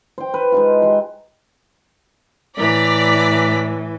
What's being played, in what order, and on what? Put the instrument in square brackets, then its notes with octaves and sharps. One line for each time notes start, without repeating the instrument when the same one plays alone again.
[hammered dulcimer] C5 G5
B4
G#3 D#4 F4
G4 E5 C6
[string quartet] A2 E3 [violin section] D5 A#5 B6